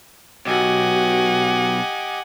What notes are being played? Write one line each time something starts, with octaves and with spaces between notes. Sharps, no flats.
B1 F#4 G4 D#5 F#5 G#5 D6